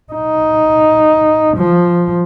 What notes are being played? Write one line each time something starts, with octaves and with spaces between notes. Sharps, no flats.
D#4
F3